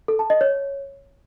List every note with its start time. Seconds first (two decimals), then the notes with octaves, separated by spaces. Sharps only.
0.08 A4
0.19 A5
0.30 D#5
0.41 C#5